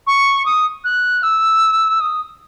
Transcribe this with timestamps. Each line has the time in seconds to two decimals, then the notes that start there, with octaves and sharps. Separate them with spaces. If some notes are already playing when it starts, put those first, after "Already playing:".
0.07 C#6
0.46 D#6
0.84 F#6
1.23 E6
2.00 D#6